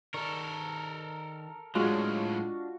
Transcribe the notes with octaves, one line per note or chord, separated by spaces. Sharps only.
D#3 A4 A#4 D5 C#6
A2 F#3 G#3 D4 F4 F#4 D#5 F5